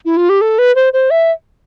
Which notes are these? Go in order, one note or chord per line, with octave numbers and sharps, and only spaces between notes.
E4
F4
G4
A4
B4
C5
C5
E5